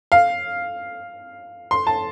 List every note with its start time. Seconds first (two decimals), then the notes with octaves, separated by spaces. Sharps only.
0.12 F5
1.71 C6
1.87 A5